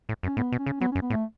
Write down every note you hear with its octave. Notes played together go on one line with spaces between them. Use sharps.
A2
F#2
C#4
A2 B3
B2
C#4
C#3
F#3 B3
F#2 C#4
B3
A2
A3